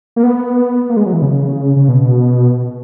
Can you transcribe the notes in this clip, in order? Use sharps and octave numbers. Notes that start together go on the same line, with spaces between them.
A#3
B3
A#3
G#3
F#3
E3
C#3
C#3
B2